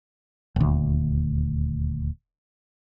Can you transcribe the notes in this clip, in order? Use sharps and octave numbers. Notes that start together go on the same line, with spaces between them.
D#1 D2